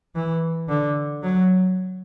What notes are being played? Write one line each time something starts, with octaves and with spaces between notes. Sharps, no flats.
E3
D3
F#3